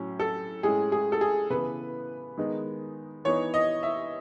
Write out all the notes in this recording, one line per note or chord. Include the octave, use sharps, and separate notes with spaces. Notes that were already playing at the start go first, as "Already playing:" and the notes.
Already playing: A2 F#3 C#4
A4
A2 G#3 C#4 G#4
G#4
A4
G#4
C#3 E3 B3 B4
D#3 G#3 B3 D#4
E3 B3 D#4 C#5
D#5
E5